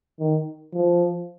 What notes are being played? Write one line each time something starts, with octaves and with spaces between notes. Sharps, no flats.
D#3
F3